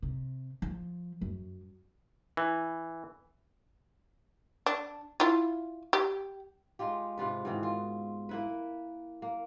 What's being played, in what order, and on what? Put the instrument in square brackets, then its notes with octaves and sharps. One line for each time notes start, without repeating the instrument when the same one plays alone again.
[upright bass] C3
F3
F#2
[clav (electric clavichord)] E3
[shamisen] D4
E4 F4
G4
[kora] G#3 D#4 F4 G4
G#2 C3 F4 B4
G#2 B2 D#3 E3
F4
A#3 E4 B4
A#3